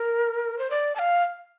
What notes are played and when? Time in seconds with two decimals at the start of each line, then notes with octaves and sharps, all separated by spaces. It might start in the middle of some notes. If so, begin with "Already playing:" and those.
Already playing: A#4
0.59 C5
0.70 D5
0.95 A5
0.99 F5